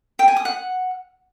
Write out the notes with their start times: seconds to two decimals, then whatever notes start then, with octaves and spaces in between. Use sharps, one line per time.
0.19 G5
0.28 G#5
0.36 D#6
0.45 F#5